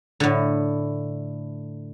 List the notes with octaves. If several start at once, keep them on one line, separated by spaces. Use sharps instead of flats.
A2 D3